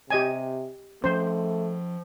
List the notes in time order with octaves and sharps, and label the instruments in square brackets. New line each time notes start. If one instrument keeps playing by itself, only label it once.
[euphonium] C3 [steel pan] G4 D#5 G#5
[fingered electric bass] F3 C#4 [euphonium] A3 [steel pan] C5